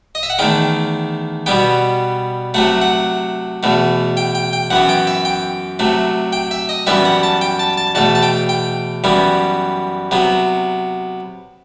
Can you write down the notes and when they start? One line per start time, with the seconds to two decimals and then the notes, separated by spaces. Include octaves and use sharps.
0.15 D#5
0.23 E5
0.30 F#5
0.39 E2 D#3 A3 G5
1.46 B2 G3 B3 G5
2.54 C3 F#3 A3 F#5
2.81 F#5
3.63 E2 B2 A3
4.17 G5
4.35 G5
4.53 G5
4.70 F#2 E3 B3 F#5
4.89 G5
5.07 E5
5.25 G5
5.79 C3 F#3 A3
6.32 G5
6.51 E5
6.69 D#5
6.87 F#2 E3 G3 B3 E5
7.05 F#5
7.23 A5
7.41 G5
7.59 A5
7.77 A5
7.95 E2 B2 A3 A5
8.15 A5
8.22 G5
8.49 G5
9.04 F#2 E3 G3 B3
10.11 C3 F#3 B3